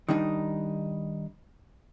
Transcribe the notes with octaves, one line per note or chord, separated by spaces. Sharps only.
D#3 G3 D4 D#4